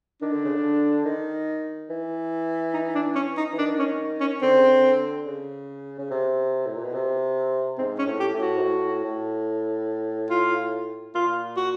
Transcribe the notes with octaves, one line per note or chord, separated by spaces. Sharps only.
D#3 D4
D3
C#3
D3
D#3
E3
D#4
D4
C#4
D#4
E3
D#3 D4
C#4
C#4
D3 C4
C#3
D3
C#3
C#3
C3
A2
A#2
B2
C3
G#2 C4
C#4
A2
G4
A2
F#4
G#2
A2
A2
F4
A#2 F4
F#4